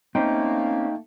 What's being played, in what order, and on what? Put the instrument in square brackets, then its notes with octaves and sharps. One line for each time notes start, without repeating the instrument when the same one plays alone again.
[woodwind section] A3 A#3 [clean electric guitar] C4 C#4 C5 [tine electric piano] D#4 G5